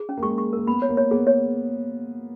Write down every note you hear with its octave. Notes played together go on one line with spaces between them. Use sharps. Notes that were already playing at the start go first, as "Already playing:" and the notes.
Already playing: G#4
C#4
A#3
G#3 C#6
C#6
A#3 A#4
B3 B5
C#5
A#3
C#5
B3 G#4
C#5